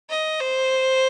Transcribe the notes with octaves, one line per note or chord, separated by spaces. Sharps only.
D#5
C5